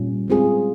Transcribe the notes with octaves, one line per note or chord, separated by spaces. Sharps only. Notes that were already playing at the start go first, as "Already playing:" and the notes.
Already playing: A#2 G3 C#4 F4
G#3 C4 F4 G#4